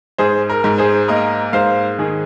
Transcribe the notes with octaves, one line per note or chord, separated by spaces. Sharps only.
G#2 G#4 C5
A#4
G#2
G#4 C5
A#3 A#4 D#5
G#2 C5 F5
D#3 G#4